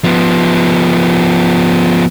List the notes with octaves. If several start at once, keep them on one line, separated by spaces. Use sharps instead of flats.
F3 B3